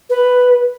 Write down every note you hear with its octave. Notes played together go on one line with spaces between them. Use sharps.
B4